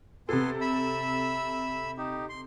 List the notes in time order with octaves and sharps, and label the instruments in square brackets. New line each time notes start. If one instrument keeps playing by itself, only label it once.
[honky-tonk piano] C3 A4 [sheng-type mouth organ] B3 G#5 C6
[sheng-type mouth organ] E5 B5 E6
D#4 G4
C6